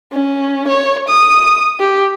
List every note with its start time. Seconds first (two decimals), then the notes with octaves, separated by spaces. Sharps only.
0.13 C#4
0.68 C#5
1.09 D#6
1.80 G4